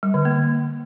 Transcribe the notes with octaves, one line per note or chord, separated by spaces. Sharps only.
G3
D3
A#3